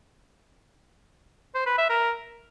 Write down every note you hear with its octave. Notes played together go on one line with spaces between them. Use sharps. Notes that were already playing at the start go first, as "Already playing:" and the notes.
C5
B4
E5
A#4